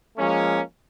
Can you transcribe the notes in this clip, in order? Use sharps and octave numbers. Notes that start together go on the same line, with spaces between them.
F3 G#3 A#3 C#4